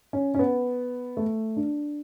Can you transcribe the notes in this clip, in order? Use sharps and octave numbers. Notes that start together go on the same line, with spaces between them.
C#4
C#4
B3
A3
D4